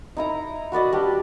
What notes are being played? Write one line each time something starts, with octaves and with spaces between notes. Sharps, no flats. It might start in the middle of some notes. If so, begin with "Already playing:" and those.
D#4 E4 A#5
F#4 B4 D5 D#5
G3 D4 G4 G5